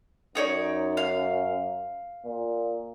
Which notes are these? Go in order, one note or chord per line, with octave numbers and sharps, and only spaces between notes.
F#2 D#4 C#5 D5
F5
A#2